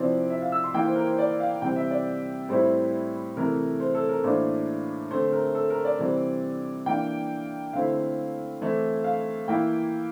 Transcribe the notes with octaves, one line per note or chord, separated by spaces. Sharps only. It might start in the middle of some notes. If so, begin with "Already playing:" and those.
Already playing: C3 F3 C4 E4 D5
E5
F5
E6
C6
E3 A#3 E4 G5
C5
A#4
C5
D5
F5
C3 E3 G3 C4 G5
E5
D5
A2 G3 C4 E4 C5
C3 E3 A3 A#4
C5
A4
A#4
A2 E3 A#3 D4 C5
D3 A3 C4 C5
A#4
A4
A#4
D5
C3 E3 G3 C4
E3 A#3 D4 G5
D3 A3 C4 E4 F5
E3 A3 C4 E4
F5
E3 A#3 E4 G5